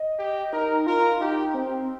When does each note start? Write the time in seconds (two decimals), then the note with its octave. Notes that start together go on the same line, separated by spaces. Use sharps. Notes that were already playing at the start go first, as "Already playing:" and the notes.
Already playing: D#5
0.19 G4
0.53 D#4 A#4
0.87 F4 A#4
1.21 D#4 G4
1.54 C4